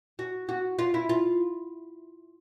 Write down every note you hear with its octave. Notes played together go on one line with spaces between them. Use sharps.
F#4
F#4
F4
E4
F4